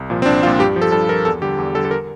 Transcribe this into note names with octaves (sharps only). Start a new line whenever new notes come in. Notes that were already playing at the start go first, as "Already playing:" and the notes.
Already playing: C2
A#2 F3
C4
C2 D4
A#2 F3 F4
G2 G4
F3
A4
G2 A4
F3 A#4
E2 A4
D3 G3 G4
E2
D3 G3 A4
A4
A#4